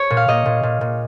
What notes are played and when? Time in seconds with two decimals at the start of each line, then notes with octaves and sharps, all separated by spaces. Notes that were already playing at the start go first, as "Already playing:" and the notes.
Already playing: C#5
0.10 A#2
0.17 F5
0.28 A#2 D#5
0.46 A#2
0.63 A#2
0.81 A#2